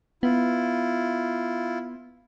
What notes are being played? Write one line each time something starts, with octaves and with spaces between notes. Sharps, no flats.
B3 E4 F4